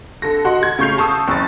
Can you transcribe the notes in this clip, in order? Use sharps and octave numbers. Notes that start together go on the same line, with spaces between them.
D3 A4 A#6
F#4 D#5 F#5 C6
G#6
C#3 A3 C#6 G6 C7 F7
A5 C#6 D#6 E6
F#1 C#6 A6